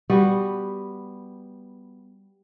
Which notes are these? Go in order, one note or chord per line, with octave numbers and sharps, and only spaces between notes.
G3 B3 F#4 B4